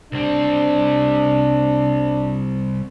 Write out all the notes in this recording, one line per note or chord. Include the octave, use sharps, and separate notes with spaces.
C2 C4 D4